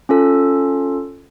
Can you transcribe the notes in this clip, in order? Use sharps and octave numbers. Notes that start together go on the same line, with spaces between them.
C#4 F4 A4